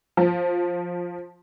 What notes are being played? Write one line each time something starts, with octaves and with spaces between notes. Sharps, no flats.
F3